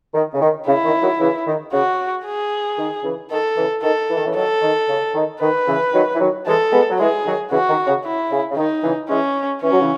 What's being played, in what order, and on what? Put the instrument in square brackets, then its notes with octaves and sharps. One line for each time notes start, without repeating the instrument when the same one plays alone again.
[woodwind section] D#3
C#3
D#3
[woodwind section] C#3 [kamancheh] E4
[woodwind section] D#3
D#3 F#3
C#3 E3
D#3
[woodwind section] C#3 [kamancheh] F#4
[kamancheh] G#4
[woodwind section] D#3
C#3 E3
[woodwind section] D#3 [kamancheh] A4
[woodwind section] C#3 E3
[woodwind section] D#3 [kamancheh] A4
[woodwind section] E3
D#3
C#3 E3
[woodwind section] D#3 F#3 [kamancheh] A4
[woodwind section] D#3
C#3
D#3
[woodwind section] D#3 [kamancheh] B4
[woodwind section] C#3 E3
D#3 F#3
E3
D#3 F#3
[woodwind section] E3 G#3 [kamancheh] A4
[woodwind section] G#3 B3
F#3
[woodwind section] E3 G#3 [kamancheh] G#4
[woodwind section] D#3 F#3
[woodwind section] C#3 E3 [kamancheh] F#4
[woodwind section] D#3
C#3
[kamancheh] E4
[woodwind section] C#3
C#3
[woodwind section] D#3 [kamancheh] D#4
[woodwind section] C#3 E3
[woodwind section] E3 G#3 [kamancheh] C#4
[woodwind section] E3 [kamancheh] C#4
[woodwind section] F#3
C#3 E3